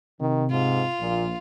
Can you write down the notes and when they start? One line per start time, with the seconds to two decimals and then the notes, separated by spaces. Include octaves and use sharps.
0.21 C3 D#3
0.51 G#2 F4
1.00 A#1 A#2